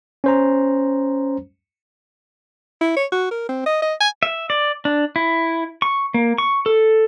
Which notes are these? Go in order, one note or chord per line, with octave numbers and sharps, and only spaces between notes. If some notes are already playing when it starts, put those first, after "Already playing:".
C#4 C5 A#5
E4
C#5
F#4
A#4
C4
D#5
D#5
G#5
E5
D5
D4
E4
C#6
A#3
C#6
A4